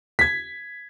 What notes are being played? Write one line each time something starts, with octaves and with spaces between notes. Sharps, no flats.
G#6 B6